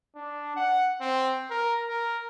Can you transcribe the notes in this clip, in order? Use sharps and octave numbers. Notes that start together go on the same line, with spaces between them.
D4
F#5
C4
A#4
A#4